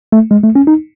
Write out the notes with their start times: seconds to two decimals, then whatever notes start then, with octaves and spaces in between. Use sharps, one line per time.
0.12 A3
0.31 G#3
0.44 A3
0.55 C#4
0.67 D#4